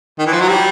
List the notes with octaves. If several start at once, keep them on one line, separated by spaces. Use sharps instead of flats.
D#3
E3
F3
F#3
G3